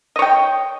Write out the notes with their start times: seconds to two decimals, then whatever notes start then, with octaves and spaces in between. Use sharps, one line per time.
0.16 D#5
0.19 C#5
0.22 G5